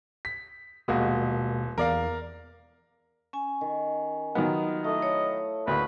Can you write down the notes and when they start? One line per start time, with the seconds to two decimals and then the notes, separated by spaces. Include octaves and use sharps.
0.25 B6
0.88 D#1 B2 G#3 A#3 F#4 D#6
1.78 E2 A#4 D5 F5
3.33 C#4 G#5
3.61 D#3
4.35 D#3 F#3 B3 D#4 F4 A#4
4.84 A3 E4 D#5
5.02 C#5
5.67 D2 C#3 A#3 B4